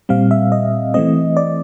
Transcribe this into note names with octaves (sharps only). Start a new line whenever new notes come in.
A#2 G3 C4 F5
E5
D#5
E3 A3 C4 D#5
D5